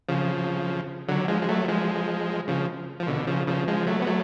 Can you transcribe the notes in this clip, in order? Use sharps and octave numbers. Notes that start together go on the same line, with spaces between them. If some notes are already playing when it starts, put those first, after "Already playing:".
C#3 F3
D3 F#3
F3 G#3
G#3
F#3 A3
F3 G#3
C#3 F3
F3
B2 D3
C#3 F3
C#3 F3
F3 G#3
F#3 A3
B3
F#3 A3